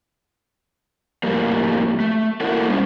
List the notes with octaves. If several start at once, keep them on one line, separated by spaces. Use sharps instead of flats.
F2 A2 G3 A#3
A3
A#3 E4 F#4 A4 A#4
G3 A3 C4 C#4